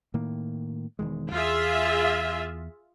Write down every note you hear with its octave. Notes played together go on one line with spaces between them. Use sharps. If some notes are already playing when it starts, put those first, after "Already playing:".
A2 D#3 A#3
E1 D#3 G#3
E2 F4 G#4 E5